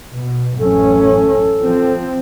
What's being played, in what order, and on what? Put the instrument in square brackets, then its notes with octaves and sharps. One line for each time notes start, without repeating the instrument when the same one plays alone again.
[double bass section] B2
[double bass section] A1 F#2 C#4 [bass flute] A4
[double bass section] F3 C4